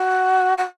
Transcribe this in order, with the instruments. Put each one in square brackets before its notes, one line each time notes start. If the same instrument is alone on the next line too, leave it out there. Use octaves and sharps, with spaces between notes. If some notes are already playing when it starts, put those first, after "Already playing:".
Already playing: [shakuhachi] F#4
F#4